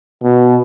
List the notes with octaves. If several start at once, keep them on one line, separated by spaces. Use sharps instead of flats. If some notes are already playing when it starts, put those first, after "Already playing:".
B2